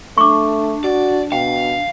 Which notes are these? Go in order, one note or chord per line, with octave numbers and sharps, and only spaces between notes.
A3 D4 C#6 D6
F#4 D5
B2 F5 G5